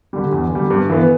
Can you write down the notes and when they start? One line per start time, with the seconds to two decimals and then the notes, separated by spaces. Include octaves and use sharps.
0.13 D3 G3
0.33 E2
0.51 D3 G3
0.70 G2
0.90 E3 B3